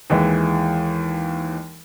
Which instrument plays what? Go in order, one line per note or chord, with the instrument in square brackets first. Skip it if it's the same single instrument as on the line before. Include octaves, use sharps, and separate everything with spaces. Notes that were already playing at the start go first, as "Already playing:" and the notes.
[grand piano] D#2 E3 G#3